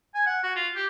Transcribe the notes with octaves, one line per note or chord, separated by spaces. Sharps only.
G#5
F#5
F#4
F4
G4